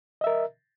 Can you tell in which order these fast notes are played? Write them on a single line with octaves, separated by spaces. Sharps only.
D#5 E5 A#4